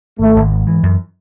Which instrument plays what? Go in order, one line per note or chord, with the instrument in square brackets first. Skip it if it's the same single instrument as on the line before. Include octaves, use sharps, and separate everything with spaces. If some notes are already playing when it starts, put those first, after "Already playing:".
[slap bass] G#1 [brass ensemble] A3
[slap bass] G#1
G#2
E3
F#2